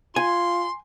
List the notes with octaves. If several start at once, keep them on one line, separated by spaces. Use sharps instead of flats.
F4 G#5 C6